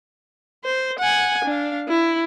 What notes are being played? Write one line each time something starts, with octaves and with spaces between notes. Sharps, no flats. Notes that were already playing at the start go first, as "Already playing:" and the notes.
C5
F#5 G#5
D4 F5
E4